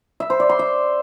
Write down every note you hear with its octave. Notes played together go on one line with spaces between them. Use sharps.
E5
C5
D5
C6
E5